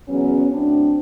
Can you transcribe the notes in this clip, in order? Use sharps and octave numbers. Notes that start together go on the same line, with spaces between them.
E2 C#3 F#3 B3 C#4
A2 F#3 C4 D4